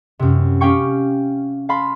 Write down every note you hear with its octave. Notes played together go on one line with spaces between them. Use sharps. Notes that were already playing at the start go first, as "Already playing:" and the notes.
F#2 C3
C#4 G4 F5 G5 C#6 C#7
F5 A5 B5 C6